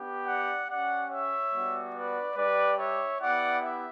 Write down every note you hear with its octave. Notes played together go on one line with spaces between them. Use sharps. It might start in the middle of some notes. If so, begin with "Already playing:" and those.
Already playing: B3 D4 G4
D5 F#5
C#4 G4 D5 F#5
C#5 E5
G3 B3 D4 F#4
B4 D5
G3 D4 G4 B4 D5
C#5 E5
B3 E4 G4 D5 F#5
E5